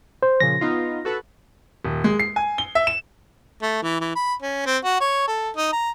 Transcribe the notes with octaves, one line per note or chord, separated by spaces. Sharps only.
C5
A#2 C#3 F3 A#6
B3 D#4 F4
F#4 A4 B4
D#1
G#3
C7
G#5
G7
E5
E7
A3
E3
E3
B5
C#4
C4
F#4
C#5
A4
D#4
A#5